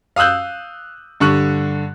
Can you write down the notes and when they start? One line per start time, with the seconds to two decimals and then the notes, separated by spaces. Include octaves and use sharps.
0.16 F5 D#6 E6 F#6 G6
1.20 G2 D3 C#6 F#6